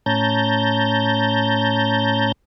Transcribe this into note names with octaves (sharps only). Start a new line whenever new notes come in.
A2 C#4 A5 A#5 G6